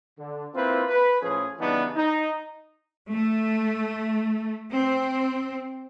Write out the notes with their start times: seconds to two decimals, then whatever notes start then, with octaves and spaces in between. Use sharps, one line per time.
0.19 D3
0.55 A#3 C4 E4 F4 B4 C5
0.88 B4
1.22 A2 F3 C#4 G#4
1.59 C#3 E3 G3 B3 D4 D#4
1.96 D#4
3.13 A3
4.75 C4